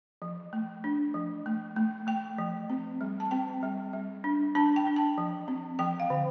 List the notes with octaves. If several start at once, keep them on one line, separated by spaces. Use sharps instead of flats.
F3
A3
D4
F3
A3
A3
A3 G5
F3
C4
G3
A5
C4 G5
G3
G3
D4
D4 A5
G5
D4
A5
F3
C4
F3 G5
F5
D3